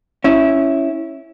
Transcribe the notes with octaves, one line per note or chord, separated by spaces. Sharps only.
C#4 E4